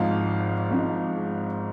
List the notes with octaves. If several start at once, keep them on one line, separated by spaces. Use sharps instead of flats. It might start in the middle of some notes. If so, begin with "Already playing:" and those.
Already playing: G#1 G#2 F3 F5
G#1 G#2 F3